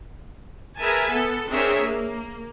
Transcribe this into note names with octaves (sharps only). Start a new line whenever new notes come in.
G#4 A#4 B4 E5 G#5 A5
B3 A4
C4 D4 G#4 A#4 C#5 E5
A#3